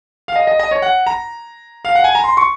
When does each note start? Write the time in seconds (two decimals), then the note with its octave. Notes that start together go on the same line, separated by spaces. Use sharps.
0.28 F5
0.36 D#5
0.47 D#5
0.59 D#5
0.71 C#5
0.82 F#5
1.06 A#5
1.85 F5
1.95 F#5
2.04 G#5
2.15 A#5
2.24 C6
2.37 C#6